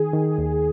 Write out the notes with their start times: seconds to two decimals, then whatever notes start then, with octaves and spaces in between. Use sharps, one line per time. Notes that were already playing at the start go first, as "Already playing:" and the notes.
Already playing: D#3 G#4
0.13 D#3
0.38 D#2